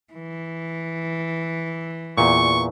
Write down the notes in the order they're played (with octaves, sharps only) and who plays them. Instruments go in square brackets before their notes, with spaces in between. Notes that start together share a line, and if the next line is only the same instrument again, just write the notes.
[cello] E3
[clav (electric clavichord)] E2 A#2 [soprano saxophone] C#6